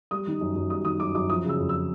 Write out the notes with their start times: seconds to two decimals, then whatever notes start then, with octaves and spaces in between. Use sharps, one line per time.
0.11 G3 D#6
0.27 D#3
0.41 F#2
0.56 F#2
0.70 G3 D#6
0.85 D#3 D#6
1.00 F#2 D6
1.15 F#2 D6
1.30 F3 D#6
1.45 C#3 E6
1.59 F2
1.69 E6